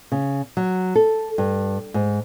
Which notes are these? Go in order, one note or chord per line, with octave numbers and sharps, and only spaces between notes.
C#3
F#3
A4
G2
G#2